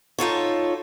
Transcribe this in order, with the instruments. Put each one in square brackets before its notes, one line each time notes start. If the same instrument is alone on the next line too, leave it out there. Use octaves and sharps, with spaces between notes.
[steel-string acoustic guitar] D#4 F4 A4 C#5